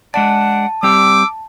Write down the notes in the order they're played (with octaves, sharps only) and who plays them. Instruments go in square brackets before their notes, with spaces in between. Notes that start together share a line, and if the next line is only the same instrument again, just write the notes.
[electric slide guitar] G#3 D4 D5 [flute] F#5 [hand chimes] A5
[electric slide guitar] G3 C4 G4 [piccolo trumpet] D6 [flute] E6